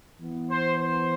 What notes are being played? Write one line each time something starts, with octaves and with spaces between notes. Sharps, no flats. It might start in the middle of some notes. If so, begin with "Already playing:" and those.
E3 B3
C5
C5